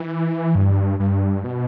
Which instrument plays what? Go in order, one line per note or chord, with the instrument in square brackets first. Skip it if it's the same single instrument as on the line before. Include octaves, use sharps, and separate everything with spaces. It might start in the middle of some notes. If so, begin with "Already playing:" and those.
Already playing: [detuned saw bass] E3
G2
G2
B2